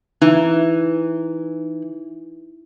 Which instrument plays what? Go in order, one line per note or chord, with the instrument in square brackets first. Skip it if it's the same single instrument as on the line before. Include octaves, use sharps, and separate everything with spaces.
[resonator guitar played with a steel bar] E3 [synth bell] D#4